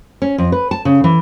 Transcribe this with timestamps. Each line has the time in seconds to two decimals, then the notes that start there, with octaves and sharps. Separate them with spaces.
0.22 C#4
0.38 F2
0.52 B4
0.71 A5
0.85 C#3
1.04 E3